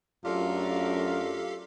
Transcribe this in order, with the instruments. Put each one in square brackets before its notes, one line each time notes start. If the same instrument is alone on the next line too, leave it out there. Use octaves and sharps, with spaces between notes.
[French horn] F#2 [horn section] A3 D4 A#4 [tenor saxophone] F4 [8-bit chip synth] G4 A4 F5